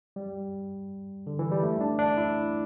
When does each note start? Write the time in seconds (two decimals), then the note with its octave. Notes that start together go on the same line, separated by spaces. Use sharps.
0.16 G3
1.27 D3
1.39 E3
1.51 G3
1.63 A3
1.81 D4
1.99 D4
2.17 E4